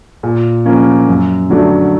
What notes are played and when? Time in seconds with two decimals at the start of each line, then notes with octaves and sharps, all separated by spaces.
0.23 A#2
0.66 F3 A#3 C#4
1.08 F#2
1.50 D3 F#3 A3 D4